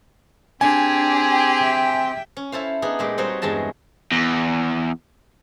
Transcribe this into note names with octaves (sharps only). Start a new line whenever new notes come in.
C4 D4 G4 G#4 G#5
E5 G5
C#4
E4 A4 C5 F5
B3 D4 D#4 G#4
A#2 G#3 G4
G3 C4 D#4 F#4 C5 C#5
E2 G2 G#3 F#4 A5
E2